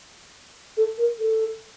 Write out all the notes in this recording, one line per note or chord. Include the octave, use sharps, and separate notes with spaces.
A4
A#4
A4